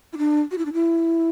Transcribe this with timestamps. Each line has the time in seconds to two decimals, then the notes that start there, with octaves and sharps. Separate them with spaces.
0.13 E4
0.18 D4
0.51 F#4
0.58 E4
0.65 D4
0.73 E4